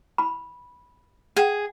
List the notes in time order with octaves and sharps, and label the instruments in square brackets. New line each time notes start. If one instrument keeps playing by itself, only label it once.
[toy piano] B5
[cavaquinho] G#4 [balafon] F#5 G5